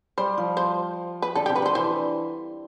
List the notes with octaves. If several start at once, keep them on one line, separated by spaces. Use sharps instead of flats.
G3 C5
F3
C5
B4
D3 A4
G4
C3
B4
D3 C5
E3 C5